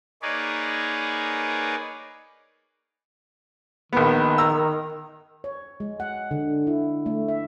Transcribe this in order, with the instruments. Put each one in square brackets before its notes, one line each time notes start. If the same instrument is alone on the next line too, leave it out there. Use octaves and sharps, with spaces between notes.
[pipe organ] A#3 D#4 G#4 B4 C#5 D5
[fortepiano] A#1 B3 [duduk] D#3
[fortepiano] A#5 E6
[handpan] C#5
G#3
F#5
D3
E4
A3
E5